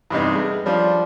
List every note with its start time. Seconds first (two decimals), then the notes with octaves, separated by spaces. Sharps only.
0.10 E2 G2 C3 D#4
0.35 G#3
0.65 F3 G3 D4